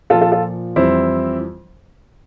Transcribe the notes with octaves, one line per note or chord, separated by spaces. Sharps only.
A#2 F3 F4 A4
F4 A4
F4 A4
F2 E3 G3 C4 E4